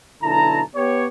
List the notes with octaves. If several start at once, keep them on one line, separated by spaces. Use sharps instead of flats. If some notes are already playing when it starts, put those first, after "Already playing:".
B1 D3 E4 A5 A#5
B3 G4 C#5